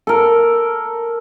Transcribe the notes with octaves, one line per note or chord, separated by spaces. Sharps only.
A4 A#4